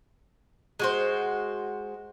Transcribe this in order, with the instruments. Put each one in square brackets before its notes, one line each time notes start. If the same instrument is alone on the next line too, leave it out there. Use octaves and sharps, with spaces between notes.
[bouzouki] G#3 F#4 C5